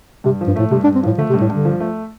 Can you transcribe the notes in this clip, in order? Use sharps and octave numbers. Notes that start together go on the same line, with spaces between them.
G2 C3
F3
G2
A2 A3
G2 C3
D4
G2
C4
A2 F3
D3 A3
C3
G2
A2
G2 D3
F3
A3